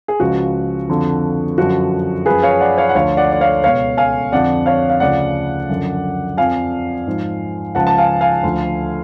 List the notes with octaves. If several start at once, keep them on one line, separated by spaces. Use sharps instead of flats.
G#4
C#2 C#3 F3 F#4
F2 D3 F3
F#2 D3 F3 F#4
F#2 F3 G#4 B4
C#5 F5
D5 F#5
C#5 F5
F#5
D2 D3 F3 C#5 F5
D5 F#5
D5
C#5 F5
C#2 B2 C#5 F5
F5 G#5
F2 D3 F3 D5 F#5
C#5 F5
F5
D2 C#3 F3 D5 F#5
F#2 D3 F3
F2 F3 F5 G#5
G#2 F3
C#2 C#3 F3 F#5 A5
A5
F5 G#5
F5 G#5
D2 D3 F3